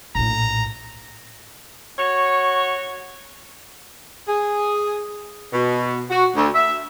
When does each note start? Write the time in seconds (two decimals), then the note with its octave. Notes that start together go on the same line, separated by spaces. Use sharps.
0.15 A#1 A2 A#5
1.99 F#4 C#5
4.28 G#4
5.53 B2
6.11 F#4
6.36 D2
6.55 E5